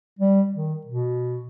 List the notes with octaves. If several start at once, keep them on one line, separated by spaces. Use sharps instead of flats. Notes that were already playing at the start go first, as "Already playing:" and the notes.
G3
D#3
B2